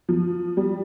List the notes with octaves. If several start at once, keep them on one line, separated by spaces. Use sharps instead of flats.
F3
G3